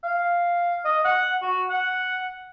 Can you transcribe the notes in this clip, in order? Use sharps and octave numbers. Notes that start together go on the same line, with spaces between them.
F5
D#5
F#5
F#4
F#5